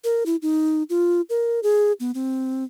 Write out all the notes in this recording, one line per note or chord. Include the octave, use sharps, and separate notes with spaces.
A#4
E4
D#4
F4
A#4
G#4
B3
C4